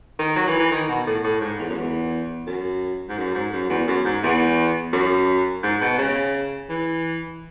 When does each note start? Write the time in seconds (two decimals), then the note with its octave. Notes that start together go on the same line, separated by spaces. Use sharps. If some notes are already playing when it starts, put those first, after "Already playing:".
0.19 D#3
0.36 F#3
0.48 E3
0.59 E3
0.71 D#3
0.88 B2
1.06 A2
1.24 A2
1.41 G#2
1.59 E2
1.69 F#2
1.77 E2
2.47 F#2
3.09 G#2
3.18 F#2
3.35 G#2
3.52 F#2
3.70 E2
3.87 F#2
4.05 G#2
4.23 E2
4.93 F#2
5.63 G#2
5.81 B2
5.98 C#3
6.69 E3